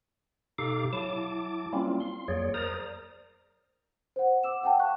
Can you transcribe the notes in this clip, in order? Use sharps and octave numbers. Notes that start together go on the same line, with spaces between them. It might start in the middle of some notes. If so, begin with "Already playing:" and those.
B2 D#4 G4 A4 F5 D6
F#3 E4 A5 D6
G3 A#3 C4 C#4 E4 F4
C6
F2 F#3 A#3 G#4 C#5 D5
A#4 C5 D5 A#5 D#6
C5 F#5
D6 E6 E7
F#5 G5 A5
F5 C#6 F#6